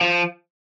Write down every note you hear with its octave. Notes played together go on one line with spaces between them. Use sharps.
F3